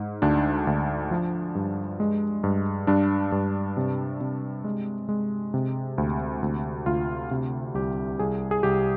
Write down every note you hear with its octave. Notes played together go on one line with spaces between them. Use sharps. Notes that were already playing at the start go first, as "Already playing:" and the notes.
Already playing: G#2
D2 D4
D2
F3
G2
G#3
G2
G2 D4
G2
C3
C3
G#3
G#3
C3
D2
D2
D2 F4
C3
C2 G4
C2 G#4
G#4
C2 G4